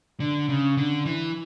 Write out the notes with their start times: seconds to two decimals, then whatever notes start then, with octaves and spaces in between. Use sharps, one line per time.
0.20 D3
0.49 C#3
0.77 D3
1.05 E3